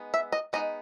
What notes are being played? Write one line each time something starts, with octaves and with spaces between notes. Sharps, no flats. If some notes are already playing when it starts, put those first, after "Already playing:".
Already playing: G#3 B3 D#4
E5
D#5
G#3 B3 D#4 D#5